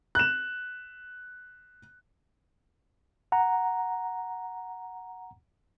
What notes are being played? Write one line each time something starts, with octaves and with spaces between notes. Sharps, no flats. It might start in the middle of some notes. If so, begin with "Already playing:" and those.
F#6 E7
F#5 A#5